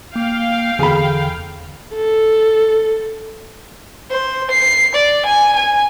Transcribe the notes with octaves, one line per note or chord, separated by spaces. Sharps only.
A#3 F5 G5
E2 D3 G#4 B5
A4
C5
C7
D5
G#5
G#5